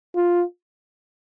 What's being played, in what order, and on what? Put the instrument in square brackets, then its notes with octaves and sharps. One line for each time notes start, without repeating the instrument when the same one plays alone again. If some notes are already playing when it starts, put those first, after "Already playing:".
[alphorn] F4